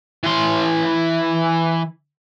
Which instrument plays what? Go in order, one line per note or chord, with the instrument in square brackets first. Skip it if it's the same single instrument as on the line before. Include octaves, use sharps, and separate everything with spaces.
[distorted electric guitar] E3 C6